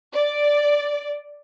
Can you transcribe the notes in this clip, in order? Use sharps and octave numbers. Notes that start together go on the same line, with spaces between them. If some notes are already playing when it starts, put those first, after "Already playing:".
D5